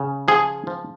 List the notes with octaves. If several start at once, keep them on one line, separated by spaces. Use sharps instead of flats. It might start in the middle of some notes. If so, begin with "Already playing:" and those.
Already playing: C#3
F3 G#4
F3